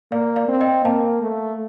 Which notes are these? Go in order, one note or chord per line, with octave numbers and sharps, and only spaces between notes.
A#3 D5 F5
D5 F5
C4
D#5 G5
A#3 F5 A5
A3